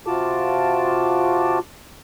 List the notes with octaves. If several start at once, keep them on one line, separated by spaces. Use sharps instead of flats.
C3 F4 F#4 A5 D6